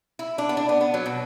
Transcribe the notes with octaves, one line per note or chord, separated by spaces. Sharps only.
E4
D4
B3
D4
B3
B3
F#3
B2